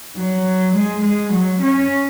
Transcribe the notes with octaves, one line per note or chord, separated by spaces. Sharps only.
F#3
G#3
G#3
F#3
C#4